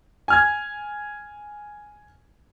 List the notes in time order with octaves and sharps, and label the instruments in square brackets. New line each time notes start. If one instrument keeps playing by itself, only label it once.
[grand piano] G#5 F6 G#6